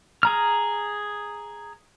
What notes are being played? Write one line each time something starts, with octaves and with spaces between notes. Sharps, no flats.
G#4 A#5 F6